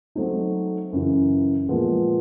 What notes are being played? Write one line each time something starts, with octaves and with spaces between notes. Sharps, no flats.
F#3 A3 C4 D#4
F#2 C#3 E3
A#2 F3 G#3 B3